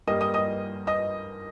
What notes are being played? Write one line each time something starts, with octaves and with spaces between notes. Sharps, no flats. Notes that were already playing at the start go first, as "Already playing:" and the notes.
G2 G3 A#3 D#5 D#6
D#5 D#6
D#5 D#6
D#5 D#6